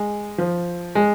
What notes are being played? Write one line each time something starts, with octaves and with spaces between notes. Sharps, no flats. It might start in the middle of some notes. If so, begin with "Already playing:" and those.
Already playing: G#3
F3
G#3